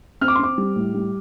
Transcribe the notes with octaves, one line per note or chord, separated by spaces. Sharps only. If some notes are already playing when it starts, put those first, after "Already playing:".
C4 F6
D6
C6
C4 D6
G3
A2
G3